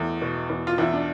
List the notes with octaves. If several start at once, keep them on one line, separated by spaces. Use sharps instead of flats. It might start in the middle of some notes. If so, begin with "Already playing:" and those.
Already playing: E2 A3
B2
E2
F4
E2 E4
D4